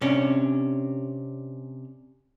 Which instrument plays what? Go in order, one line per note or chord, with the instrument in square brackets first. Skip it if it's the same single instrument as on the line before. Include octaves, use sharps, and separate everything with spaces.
[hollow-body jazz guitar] C3 C#4 D4